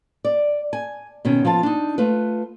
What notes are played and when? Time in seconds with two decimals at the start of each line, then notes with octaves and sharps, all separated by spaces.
0.25 D5
0.73 G#5
1.25 B2 D#3 C#4
1.45 F3 B3 F4 A5
1.63 D4 D#4
1.98 A3 F4 B4